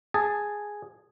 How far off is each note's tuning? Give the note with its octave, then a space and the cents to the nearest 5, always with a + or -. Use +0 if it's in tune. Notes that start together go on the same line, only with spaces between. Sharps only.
G#4 +0 A5 +0